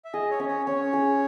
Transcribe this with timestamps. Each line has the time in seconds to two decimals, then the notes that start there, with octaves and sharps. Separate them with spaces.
0.05 E5
0.13 G#4 D#5
0.31 C#5
0.39 C#4
0.48 C#5
0.66 C#4 C#5
0.93 G#4